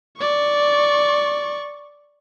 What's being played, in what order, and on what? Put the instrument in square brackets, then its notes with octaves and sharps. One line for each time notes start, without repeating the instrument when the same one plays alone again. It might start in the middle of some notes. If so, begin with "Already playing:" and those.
[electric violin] D5 C#6